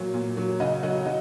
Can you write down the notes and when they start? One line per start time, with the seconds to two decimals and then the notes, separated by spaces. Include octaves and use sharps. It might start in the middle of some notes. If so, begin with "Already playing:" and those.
Already playing: A#2 F#3
0.14 A#2
0.37 F#3
0.60 C#3 D#5 F#5
0.83 F#3 D#5 F#5
1.05 F#3 D#5